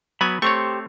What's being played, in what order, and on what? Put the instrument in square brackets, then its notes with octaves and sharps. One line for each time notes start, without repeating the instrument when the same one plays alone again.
[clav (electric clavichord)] F#3 B3 G#5 [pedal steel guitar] B5
[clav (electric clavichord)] A3 C4 C#5 [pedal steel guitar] G4 C5 [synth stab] C#6